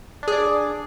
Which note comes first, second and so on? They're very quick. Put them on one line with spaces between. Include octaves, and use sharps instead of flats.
D4 G#4 D5